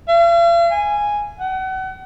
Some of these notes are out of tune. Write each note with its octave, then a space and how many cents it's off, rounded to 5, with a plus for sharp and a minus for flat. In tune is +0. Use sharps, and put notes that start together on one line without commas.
F5 -45
G#5 -5
F#5 +35